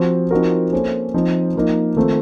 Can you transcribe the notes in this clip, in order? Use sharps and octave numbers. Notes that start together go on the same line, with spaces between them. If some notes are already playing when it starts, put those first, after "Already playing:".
Already playing: F3 C4 F#4 C5
F3 C4 D#4 F#4 A#4
A#3 C#4 A4 C5
F3 C4 D#4
F3 A#3 D#4
D#3 A3 C4 F4